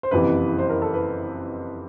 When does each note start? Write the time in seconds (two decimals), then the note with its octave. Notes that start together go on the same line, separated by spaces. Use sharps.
0.03 C5
0.11 F#1 F2 C3 E3 B4
0.58 C5
0.69 A#4
0.82 A4
0.94 B4